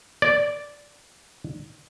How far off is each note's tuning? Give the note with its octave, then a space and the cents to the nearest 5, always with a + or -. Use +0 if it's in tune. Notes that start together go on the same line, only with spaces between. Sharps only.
D5 -5